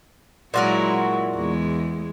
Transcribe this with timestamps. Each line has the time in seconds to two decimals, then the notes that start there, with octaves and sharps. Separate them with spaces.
0.54 A#2 F#3 G#3 E4 F#4 A#4
1.35 E2 G#3